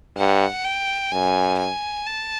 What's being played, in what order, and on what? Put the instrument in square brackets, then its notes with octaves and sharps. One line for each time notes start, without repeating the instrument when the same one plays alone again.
[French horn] G2 [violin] F#5
[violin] G5
[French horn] F#2 [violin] G#5
[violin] G#5
A5